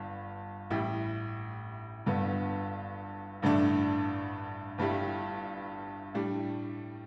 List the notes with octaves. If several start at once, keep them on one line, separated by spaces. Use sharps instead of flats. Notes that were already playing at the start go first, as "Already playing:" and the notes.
Already playing: G1 G2
A1 A2 G3 E4 G4
G1 G2 D3 B3
A1 G2 D3 A3 D4
G1 G2 G3 E4
A2 G3 D4